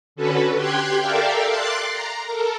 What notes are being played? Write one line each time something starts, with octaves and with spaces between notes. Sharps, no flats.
D3 C#4 F#4 A4 B4
G4 G5 C6 F#6 G#6
A4 A#4 D5 E5 F5 G5
C6 D6 F#6 A6 C7
A#5
A4 A#4